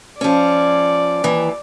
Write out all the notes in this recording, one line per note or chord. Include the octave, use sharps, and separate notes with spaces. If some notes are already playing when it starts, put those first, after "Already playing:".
F3 C#4 D5
D#2 E3